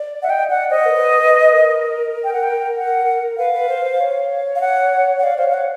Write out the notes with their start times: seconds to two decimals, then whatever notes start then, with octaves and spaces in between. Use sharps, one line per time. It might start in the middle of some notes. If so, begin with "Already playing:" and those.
Already playing: D5
0.23 E5 F#5
0.30 D#5 G5
0.50 D5 F#5
0.71 C5 D#5
0.86 A#4
0.91 B4
1.22 B4
1.53 A#4
2.24 G5
2.33 F#5
2.43 G5
2.77 F#5
3.38 B4 F5
3.54 B4
3.69 C5
3.85 C5
4.00 C#5
4.55 F5
4.61 F#5
5.19 F#5
5.23 D5 F5
5.38 C5 F5
5.43 C#5
5.49 F5
5.54 F#5